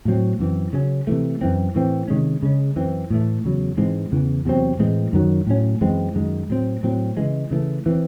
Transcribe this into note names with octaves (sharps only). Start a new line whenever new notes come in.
A2 F#3 C4
F#2 E3 C4
C#3 F#3 C#4
C3 E3 A3
F#2 E3 C4
A2 E3 C4
C3 D#3 G#3 C#4
C#3 G#3 C#4
F#2 E3 C4
A2 E3 A3
E2 C#3 F#3
G#2 E3 G#3 C4
E2 C#3 E3
E2 C3 F#3 C4
A2 E3 G#3 C4
F#2 D#3 F#3
A2 F#3 C#4
F#2 E3 G#3 C4
F#2 D#3 G#3
A2 F#3 C4
A2 F#3 C4
C#3 E3 G#3
C#3 E3 A3
E3 A3 C4